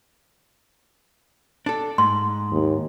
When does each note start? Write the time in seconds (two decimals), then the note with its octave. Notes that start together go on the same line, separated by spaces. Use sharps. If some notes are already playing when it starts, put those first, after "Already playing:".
1.66 D4 A4
1.98 G#2 C6
2.52 D#2